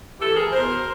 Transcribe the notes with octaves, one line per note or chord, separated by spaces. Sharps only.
A2 E3 G4 A4
G#4 A#4
E2 B2 A#4 C5